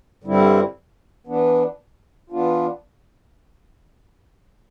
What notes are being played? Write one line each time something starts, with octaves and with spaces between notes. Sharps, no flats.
G2 D3 G3 C4 E4
E3 B3 D4
E3 B3 D4 F4